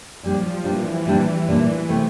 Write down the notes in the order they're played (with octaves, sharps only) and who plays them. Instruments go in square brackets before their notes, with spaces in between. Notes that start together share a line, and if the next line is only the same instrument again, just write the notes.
[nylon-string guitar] A#2 G3 D4 [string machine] F3
[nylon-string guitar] A#2 G3 D4 [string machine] E3
[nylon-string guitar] A#2 G3 D4
A#2 G3 D4
C3 E3 A3